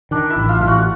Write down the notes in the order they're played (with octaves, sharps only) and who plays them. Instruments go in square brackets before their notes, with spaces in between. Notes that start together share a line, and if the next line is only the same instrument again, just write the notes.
[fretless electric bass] D#3 [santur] D4 D5
[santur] E4 E5
[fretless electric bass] A1
[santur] F4 F5
[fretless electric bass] A1
[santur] F#4 F#5